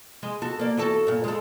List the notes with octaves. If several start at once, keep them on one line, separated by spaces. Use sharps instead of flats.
G#3
F#4 A4
A#3 D5
E2 F#4 A4
G2 A#2
G#3 A4